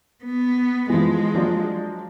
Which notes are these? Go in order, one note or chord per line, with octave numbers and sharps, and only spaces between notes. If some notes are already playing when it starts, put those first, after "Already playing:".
B3
E3 F3 G#3
F3 F#3 D4